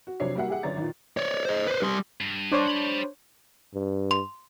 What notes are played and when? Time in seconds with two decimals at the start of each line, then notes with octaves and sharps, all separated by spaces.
0.07 F#4
0.20 F2 C3 F#3 D4 C#5 C7
0.35 G3 A#3 F#4 E5 F#5
0.48 G4 G#4 E5 F#5
0.63 G1 F#2 C#5 D5 A#5 A6
0.77 A#2 D#3
1.17 C#5 D5
1.45 C5 D#5
1.67 B4 C5
1.82 G3 C6
2.21 G2
2.52 D4 C5 C#5
2.68 G4 B5
3.74 G2
4.11 C6